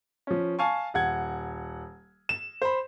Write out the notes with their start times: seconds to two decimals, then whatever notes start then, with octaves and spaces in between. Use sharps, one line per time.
0.27 F3 C#4
0.59 F5 G#5 A5 C#6
0.94 D#1 F#5 G#6
2.29 E7
2.62 C5 B5